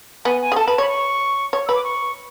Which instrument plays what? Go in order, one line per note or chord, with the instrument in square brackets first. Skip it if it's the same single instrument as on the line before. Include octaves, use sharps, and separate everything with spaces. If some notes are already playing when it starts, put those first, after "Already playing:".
[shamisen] B3 [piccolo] G#5
[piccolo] G#5
[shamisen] G#4
[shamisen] A4 [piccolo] A5
[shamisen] B4
[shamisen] C#5 [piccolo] B5
[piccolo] C#6
[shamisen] C#5
[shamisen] B4 [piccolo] E6
[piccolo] D6
C#6